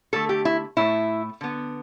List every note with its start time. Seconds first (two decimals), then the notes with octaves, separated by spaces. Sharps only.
0.13 D3 A3 A4
0.29 G4
0.45 E4
0.77 A2 A3 E4
1.41 D3 B3